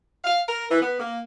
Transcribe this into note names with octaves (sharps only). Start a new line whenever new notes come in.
F5
A#4
E3
B3
A#3